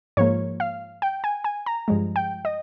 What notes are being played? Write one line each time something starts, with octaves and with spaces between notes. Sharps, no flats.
G#2 F3 A#3 C#5
F5
G5
G#5
G#5
A#5
G2 F3 G#3
G5
D#5